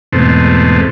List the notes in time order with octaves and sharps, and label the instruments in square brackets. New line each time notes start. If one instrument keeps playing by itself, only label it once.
[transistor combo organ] E2 G#2 B2 A3 C4